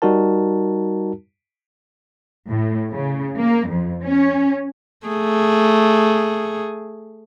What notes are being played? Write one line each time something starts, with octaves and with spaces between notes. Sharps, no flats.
G3 D#4 F#4 A#4 A5
A2
C#3
A#3
F2
C#4
A3 G#4